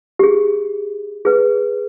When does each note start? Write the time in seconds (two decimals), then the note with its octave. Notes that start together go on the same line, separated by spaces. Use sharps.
0.19 G4 G#4
1.25 G#4 B4